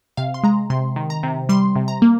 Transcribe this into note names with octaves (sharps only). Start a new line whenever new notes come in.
C3 F5
C6
G#3 A#5
C3 C6
D#3
A#5
C3
G3 C6
C3
A#5
A#3